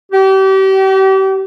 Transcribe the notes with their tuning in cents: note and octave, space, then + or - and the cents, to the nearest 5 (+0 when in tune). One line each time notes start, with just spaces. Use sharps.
G4 -35